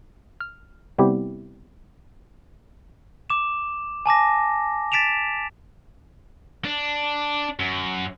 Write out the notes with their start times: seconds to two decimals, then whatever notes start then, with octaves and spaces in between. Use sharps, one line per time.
0.41 F6
0.98 C3 G3 B3 C4 E4 G4
3.30 D6 E7
4.06 G#5 A5 D6 A#6
4.92 A6 B6 D7 E7 F7
6.65 D4
7.60 F#2